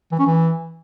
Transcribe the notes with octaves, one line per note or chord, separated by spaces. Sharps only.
E3
C#4
E3